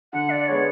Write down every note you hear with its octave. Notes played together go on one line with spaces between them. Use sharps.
D3 F#5
D5
G#3 B3 C#5